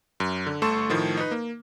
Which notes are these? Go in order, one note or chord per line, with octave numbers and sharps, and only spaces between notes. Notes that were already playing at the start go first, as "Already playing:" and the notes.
F#2
D3
G1 A3 A4 C6 C#6 E7
A2 D#3 F3
D#4 B4
A#3